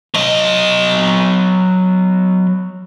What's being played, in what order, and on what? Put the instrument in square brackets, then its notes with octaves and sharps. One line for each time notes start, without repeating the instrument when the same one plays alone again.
[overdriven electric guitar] F#3 D#5